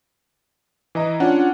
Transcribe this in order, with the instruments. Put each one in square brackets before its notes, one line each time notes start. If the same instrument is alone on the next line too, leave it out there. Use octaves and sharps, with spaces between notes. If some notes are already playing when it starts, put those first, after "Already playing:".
[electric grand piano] E3 D#5 A#5
[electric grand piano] C#4 D4 F#5 [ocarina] F4